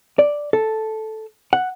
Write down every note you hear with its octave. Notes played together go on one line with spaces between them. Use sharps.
D5
A4
F#5